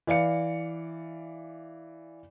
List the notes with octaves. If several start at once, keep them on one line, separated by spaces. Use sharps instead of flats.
E3 D5 F5 C#7